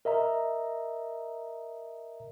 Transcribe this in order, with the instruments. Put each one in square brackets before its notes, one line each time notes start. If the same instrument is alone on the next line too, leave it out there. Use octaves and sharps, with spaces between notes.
[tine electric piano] A#4 D#5 E5 A#5